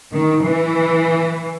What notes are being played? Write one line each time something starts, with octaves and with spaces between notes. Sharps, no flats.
D#3
E3